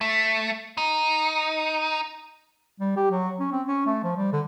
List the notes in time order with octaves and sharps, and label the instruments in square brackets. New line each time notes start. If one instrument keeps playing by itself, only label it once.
[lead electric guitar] A3
D#4
[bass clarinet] G3
G4
F#3
C#4
C4
C#4
A3
F3
G3
D3